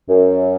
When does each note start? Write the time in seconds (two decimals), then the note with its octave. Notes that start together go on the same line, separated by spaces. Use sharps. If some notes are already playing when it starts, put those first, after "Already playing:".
0.08 F#2